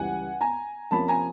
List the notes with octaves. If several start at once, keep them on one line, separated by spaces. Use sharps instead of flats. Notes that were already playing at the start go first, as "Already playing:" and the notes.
Already playing: C#2 C#3 E3 G3 F#5 G#5
G#5 A#5
C3 F3 A#3 C#4 A5 B5
G#5 A#5